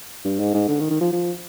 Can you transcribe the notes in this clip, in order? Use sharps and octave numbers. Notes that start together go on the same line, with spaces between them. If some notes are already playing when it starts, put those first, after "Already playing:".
G2
G#2
G#2
D3
D#3
D#3
F3
F3